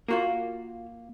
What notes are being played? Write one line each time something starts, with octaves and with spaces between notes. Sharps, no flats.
A#3 F4 F#4 A#4